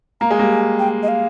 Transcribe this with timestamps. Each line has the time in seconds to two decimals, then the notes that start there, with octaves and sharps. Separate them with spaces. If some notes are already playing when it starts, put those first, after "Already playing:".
0.21 A#3 A#5
0.30 G#3
0.39 G3 A#3
0.51 G#5
0.79 G5
1.03 D#5
1.08 F5